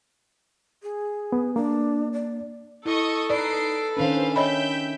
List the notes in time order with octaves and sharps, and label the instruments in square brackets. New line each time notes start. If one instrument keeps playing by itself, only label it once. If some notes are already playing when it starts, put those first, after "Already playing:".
[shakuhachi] G#4
[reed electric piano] B3
[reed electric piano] A#3 [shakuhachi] D4
[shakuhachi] D5
[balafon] E4 [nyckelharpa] A4 [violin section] D#5 C#6 D#6
[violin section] D#4 C7 D7 [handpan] B4 [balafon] D5
[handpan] D#3 C#4 D4 [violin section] B4 C5 F5
[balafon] C#5 D#5 B5 [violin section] E5 G5 G6